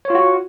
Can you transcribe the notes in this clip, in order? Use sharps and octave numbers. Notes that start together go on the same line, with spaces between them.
F4 F#4 C#5